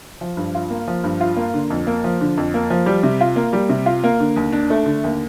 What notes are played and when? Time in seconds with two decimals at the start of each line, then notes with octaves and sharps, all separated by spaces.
0.21 F3
0.37 G2
0.55 F4
0.70 A#3
0.87 F3
1.04 G2
1.21 F4
1.37 A#3
1.54 D3
1.70 F2
1.87 A#3
2.04 F3
2.21 D3
2.37 F2
2.54 A#3
2.70 F3
2.86 G3
3.03 C3
3.21 F4
3.36 A#3
3.53 G3
3.69 C3
3.86 F4
4.04 A#3
4.20 D3
4.36 D#2
4.53 D4
4.70 A3
4.86 D3
5.04 D#2